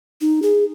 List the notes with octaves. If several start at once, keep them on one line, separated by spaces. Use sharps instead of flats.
D#4
G#4